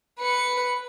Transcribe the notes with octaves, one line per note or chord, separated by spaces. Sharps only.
B4 C#7